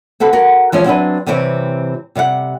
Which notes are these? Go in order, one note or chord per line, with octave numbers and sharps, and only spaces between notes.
C4 F#4 A4 B4
F#4 A#4 F#5
E3 F3 G#3 C#4
F#3 C4 D4 E4 B4 D#5
C3 E3 G3 C4 C#4
C3 G3 F5 F#5